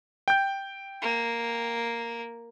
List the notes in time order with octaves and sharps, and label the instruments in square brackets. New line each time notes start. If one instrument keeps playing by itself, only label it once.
[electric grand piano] G5 G6
[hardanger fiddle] A#3